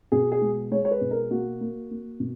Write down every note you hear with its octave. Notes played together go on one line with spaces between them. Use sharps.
B2 G#4
G#4
G#3
G#3 C#5
C#5
B4
B2
A#4
A#3 F#4
A#3
A#3
B2